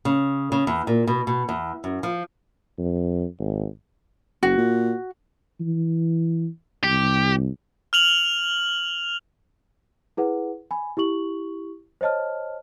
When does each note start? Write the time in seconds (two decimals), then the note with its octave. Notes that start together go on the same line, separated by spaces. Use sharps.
0.05 C#3
0.52 C#3
0.67 E2
0.87 A#2
1.07 B2
1.27 B2
1.49 E2
1.84 F#2
2.03 F3
2.78 F2
3.39 G#1
4.43 F#1 F#4
4.57 A#2
5.60 E3
6.84 C2 G4
7.93 F6 F7 F#7
10.17 E4 G#4 B4 F#5
10.71 G#5 B5
10.97 E4 G4 C#6 F#7
12.01 C5 C#5 D#5 A5 F6